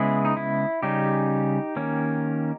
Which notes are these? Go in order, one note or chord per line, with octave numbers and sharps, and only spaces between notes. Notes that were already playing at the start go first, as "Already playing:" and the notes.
Already playing: C#3 G#3 B3 E4 G#4
D#4
E4
C#3 G3 C#4 D#4 G4
D#3 A#3 C#4